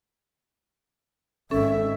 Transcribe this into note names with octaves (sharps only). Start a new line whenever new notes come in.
G#1 C#4 A4 E5